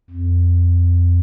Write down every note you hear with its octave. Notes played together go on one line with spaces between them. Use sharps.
F2